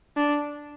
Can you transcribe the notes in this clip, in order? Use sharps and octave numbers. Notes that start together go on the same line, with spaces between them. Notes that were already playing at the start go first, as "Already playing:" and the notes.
D4